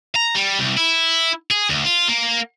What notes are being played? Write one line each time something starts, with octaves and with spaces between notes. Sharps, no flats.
A#5
G3
C2
E4
G#4
D2
F4
A#3